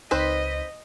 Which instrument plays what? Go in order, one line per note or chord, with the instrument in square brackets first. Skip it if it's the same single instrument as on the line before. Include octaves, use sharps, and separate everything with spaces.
[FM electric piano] C#2 D#4 B6 [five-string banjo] C4 B4 C5 [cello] D#5